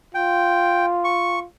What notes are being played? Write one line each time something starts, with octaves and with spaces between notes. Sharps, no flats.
F4 G5
C#6